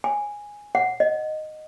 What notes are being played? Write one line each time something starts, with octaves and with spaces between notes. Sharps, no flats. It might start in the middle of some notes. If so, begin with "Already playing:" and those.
G#5
F#5
D#5